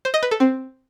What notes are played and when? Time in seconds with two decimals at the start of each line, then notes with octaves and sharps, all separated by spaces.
0.05 C5
0.14 D#5
0.23 B4
0.31 A4
0.40 C4